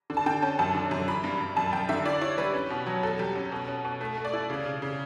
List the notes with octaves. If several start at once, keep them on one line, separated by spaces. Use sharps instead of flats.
D3
A5
D3 G5
C#4 A5
F#2 A5
D3
F#2
E3 B5
G2
G2
F#2 A5
F#2 G5
D3 E5
E4 D5
E4 C#5
G3 B4
C#4
B2
F#3
E2 A4
G3
C#4
B2
C#4
B2
A3
A3
D5
E4
C#3
C#3
C#3